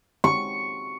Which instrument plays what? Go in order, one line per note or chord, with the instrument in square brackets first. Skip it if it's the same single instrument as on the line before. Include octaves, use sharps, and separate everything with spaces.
[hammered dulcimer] C#6